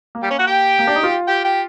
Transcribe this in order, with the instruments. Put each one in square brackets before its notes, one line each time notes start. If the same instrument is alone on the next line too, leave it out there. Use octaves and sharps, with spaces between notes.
[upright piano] A#3
[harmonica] G3 G4
C#4 C#5
F#4 F#5
G4 G5
[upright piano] A#3
D4
D#4
F4
[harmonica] G4 G5
G4 G5